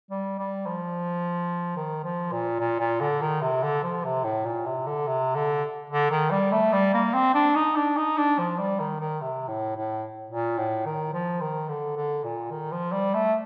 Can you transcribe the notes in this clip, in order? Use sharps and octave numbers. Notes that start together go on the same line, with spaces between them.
G3
G3
F3
D#3
F3
A#2
A#2
A#2
D3
D#3
C3
D3
F3
C3
A2
A#2
C3
D3
C3
D3
D3
D#3
G3
A3
G3
A#3
C4
D4
D#4
D4
D#4
D4
F3
G3
D#3
D#3
C3
A2
A2
A#2
A2
D#3
F3
D#3
D3
D3
A#2
D#3
F3
G3
A3